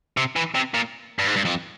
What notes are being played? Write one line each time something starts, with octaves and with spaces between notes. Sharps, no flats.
C3
E3
C3
A#2
G2
G#2
G2
F2